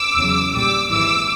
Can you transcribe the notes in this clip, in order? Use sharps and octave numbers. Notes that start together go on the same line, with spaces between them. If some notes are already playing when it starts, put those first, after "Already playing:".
Already playing: D6 E6
E2 C#3 F#3
A#1 A#2 G3 D6 E6
G#1 G#2 E3 D6 E6